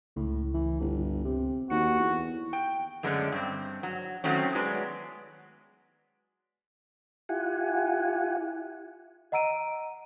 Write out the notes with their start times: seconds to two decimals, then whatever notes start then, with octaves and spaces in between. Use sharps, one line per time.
0.17 C#2 A2
0.54 E3
0.81 G1
1.25 C3
1.70 D#2 F#4 C#7
1.99 E2
2.53 G5
3.03 F#2 D3 G#3 A3 C#4 D4
3.32 G2 C4
3.83 F#3
4.24 D#3 F#3 A3 C4 C#4
4.55 F#3 G#3 B3 D5
7.29 E4 F4 G4 F#5 G#5
9.32 D#5 F#5 A#5 E6 D7 D#7